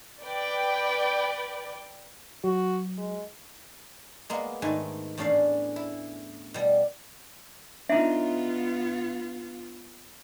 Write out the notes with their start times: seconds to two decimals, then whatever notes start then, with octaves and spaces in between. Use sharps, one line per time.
0.22 B4 D5 G5
2.44 F#3 F#4
2.98 G#3
4.30 G#3 A#3 B3
4.62 G#2 D#3 A3 B4 F#5 G#5
5.18 E2 A2 C#4 D4 G#4 F5
5.76 E4
6.54 B2 G3
7.89 B3 D4 D#4 F4 E5